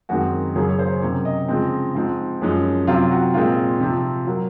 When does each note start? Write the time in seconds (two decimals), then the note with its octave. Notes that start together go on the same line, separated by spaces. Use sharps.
0.09 F#2 D#3 G#3 C4 F#4
0.55 F#2 C#3 F#3 A#3 C#4 G#4
0.69 C#5
0.79 C5
1.02 C3 F#3 A#3 C#4 C#5
1.25 D#5
1.48 C#3 F3 G#3 C4
1.95 G#2 F3 C4
2.41 F#2 F3 G#3 C#4
2.87 C3 F#3 C4 F4
3.11 F#4
3.34 A#2 G#3 C4 F4
3.80 C3 F3 C4
4.27 F#3 A#3